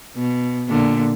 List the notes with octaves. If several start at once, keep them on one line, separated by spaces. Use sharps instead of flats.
B2
A#2 D3